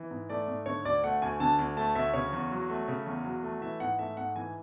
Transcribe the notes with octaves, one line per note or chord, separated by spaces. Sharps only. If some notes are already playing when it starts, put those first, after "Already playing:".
Already playing: E3
G#2
A3 D5
G#2
D3 C#5
D2 D5
A3 F#5
D2 G#5
D3 A5
D2
A3 A5
D2 E5
C#3 C#5
E2
F#3
A3
C#3
E2
F#3
A3
E3 E5
G#2 F#5
A3 E5
G#2 F#5
E3 G#5